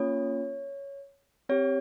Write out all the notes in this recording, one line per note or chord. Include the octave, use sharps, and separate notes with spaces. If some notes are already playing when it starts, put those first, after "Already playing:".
Already playing: A#3 C#4 F4 C#5
C4 G4 C#5